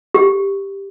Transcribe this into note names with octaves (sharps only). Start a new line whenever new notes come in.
G4